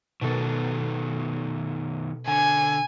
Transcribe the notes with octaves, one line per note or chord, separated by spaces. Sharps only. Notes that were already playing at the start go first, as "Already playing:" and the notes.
B2 D#3 F#3 B3 A4
D3 G#5